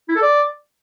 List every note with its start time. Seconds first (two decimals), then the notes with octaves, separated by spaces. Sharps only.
0.09 E4
0.15 A4
0.22 D5